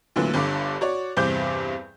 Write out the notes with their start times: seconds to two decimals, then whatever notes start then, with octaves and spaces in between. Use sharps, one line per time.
0.16 D2 A#2 D3 E3 F#3
0.34 G1 G2 D3 D6
0.81 F#4 C#5 D5
1.17 E2 G2 C3 C5 D6 G6